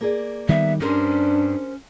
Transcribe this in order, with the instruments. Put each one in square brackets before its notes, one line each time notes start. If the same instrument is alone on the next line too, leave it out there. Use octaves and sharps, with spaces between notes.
[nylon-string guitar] A#3 G#4 D5
[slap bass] D#3 G3 B3 [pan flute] E5
[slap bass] G2 [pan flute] C#4 [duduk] D4 [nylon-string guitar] G4 A#4 C5